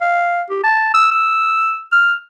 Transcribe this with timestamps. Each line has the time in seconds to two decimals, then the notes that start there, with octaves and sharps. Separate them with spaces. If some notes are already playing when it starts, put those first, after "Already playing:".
0.01 F5
0.50 G4
0.64 A5
0.94 E6
1.11 E6
1.92 F6